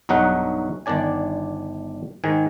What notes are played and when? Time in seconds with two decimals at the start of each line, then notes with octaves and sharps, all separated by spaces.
0.09 B1 G2 F#3 D#4 F#4 F#5
0.86 G1 D#3 D4 D5 G#5
2.24 G#2 D#3 G#5